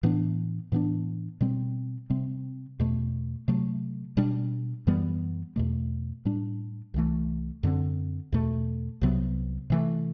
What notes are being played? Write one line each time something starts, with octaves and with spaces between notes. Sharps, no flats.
A2 E3 B3 D4
A2 E3 B3 D4
B2 G3 C4
C3 G3 C4
E2 B2 A3
C3 F#3 A3
B2 G3 D4
F#2 E3 G3 B3
E2 B2 A3
A2 G3 D4
C2 C3 E3 A3
F#2 D3 G3 C4
E2 B2 A3
C2 C3 F#3 B3
C3 E3 A3